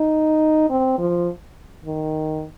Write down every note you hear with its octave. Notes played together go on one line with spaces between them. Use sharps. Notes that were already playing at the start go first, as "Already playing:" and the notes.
Already playing: D#4
C4
F3
D#3